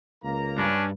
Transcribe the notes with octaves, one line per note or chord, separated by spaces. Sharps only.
C#2 A#3 A#5
G2 C#4 D4